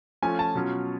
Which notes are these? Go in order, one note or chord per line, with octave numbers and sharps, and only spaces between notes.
F3 A3 C#4 F4 G#5
A5
B2 F#3 C#4 F4